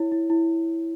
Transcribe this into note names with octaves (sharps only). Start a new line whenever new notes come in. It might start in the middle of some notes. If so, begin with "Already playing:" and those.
Already playing: E4 C#5
E4
E4